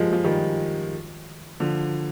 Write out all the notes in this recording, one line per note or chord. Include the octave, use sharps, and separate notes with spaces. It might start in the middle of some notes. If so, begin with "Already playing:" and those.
Already playing: F3 G3 G#3 A#3
F3
D#3 G3
D3 F3